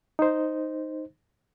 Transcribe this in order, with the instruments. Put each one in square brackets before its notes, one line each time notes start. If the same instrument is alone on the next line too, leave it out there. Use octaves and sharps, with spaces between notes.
[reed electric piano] D#4 C5